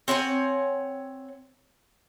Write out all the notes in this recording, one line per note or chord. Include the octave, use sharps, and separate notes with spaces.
C4 C#5 F#5 G#5